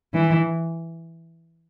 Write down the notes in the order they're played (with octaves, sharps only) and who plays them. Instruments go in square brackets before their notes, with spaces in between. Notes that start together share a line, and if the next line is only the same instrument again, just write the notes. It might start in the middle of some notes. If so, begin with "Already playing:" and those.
[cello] E3